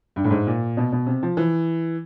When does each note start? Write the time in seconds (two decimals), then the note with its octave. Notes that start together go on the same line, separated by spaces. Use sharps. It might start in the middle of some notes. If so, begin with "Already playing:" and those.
0.16 G2
0.24 A2
0.31 G#2
0.47 A#2
0.77 B2
0.92 B2
1.07 C3
1.23 F3
1.37 E3